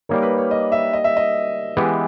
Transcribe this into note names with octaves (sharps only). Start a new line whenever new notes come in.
G3 A#3 D#4 A#4 C#5
B4
C#5
D#5
E5
D#5
E5
D#5
E3 G#3 B3 G4